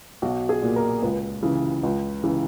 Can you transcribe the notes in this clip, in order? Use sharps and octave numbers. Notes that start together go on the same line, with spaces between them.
B1 F#4
G#4
A#2
A#4
C#2 B4
C#3 E3
C#2
C#3 E3